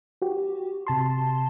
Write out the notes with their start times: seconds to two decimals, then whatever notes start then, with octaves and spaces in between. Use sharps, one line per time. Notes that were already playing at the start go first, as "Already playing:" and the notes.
0.22 F#4 G4
0.87 C3 A5 C6